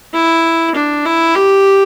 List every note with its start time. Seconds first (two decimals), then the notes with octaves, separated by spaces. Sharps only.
0.13 E4
0.75 D4
1.05 E4
1.35 G4